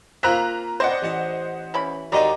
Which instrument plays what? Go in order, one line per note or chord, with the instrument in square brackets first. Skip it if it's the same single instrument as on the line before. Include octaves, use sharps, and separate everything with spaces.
[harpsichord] A#3 F4 A#4 [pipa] C4 [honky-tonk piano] A#5 F#6 B6
[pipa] C4 D5 [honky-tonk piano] C5 D#5 F#5
[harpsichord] A1 A5
[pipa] E3 C#4 B5
[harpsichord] D#2 D#5 A5 [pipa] F#3 G#3 D#4 [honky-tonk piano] D5 A#5